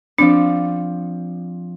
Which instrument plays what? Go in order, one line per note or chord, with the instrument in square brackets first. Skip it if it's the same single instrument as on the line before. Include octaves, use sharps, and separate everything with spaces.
[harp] F3 C4 D5 [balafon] D4